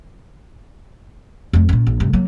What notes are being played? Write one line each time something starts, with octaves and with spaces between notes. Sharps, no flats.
F2 A3
A#2 C#4
A#1
G2 C3
F#3 A#3